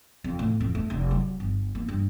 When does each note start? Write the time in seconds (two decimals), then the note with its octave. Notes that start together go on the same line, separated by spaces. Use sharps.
0.24 F2
0.39 A2
0.60 F2
0.75 A3
0.90 F1
1.11 F#3
1.40 G1
1.75 A#3
1.88 G2